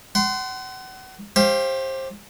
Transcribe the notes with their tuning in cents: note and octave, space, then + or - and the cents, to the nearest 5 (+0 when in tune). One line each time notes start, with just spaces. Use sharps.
F#5 +35 C6 -20
G4 +0 C5 +25 F5 -15